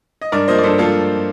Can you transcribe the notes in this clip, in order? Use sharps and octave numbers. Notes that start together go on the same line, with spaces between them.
D#5
G2 A#4 D5
F3 A#3 C5 D#5
D5
G2 A4 C5
F3 A#3 F4 A4